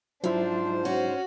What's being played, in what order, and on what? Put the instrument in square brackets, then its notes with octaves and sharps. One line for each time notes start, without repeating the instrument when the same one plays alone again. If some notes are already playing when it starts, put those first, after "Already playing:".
[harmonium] G#2 C5 [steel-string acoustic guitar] F3 [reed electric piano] F#3 E4 E5 [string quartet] D4
[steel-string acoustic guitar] C#4 [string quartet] F#4